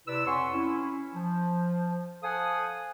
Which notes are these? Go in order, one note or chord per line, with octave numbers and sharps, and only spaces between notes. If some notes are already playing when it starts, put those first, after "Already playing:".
C3 E4 B4 D5 E6
F2 C#5 F#5 G#5 C6 C#6
C#4 E4
F3
A4 C5 F5 F#5 G#5 D#6